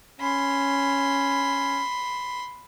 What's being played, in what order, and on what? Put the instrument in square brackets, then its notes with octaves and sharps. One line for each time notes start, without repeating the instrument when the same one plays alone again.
[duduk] C#4 [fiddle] B5 C6